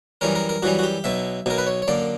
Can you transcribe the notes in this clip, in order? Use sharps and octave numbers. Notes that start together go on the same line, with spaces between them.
F#2 E3 G3 C#4 A#4
A#4
A#4
F#2 E3 G3 C#4 F#4
F#4
G4
B1 B2 F#3 E5
B1 B2 F#3 A#4
B4
C#5
C#5
F#2 D3 A#3 D5